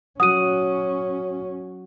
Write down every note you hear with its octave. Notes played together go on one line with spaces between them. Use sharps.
F#3 C#4 F#4 F#5 D#6 D#7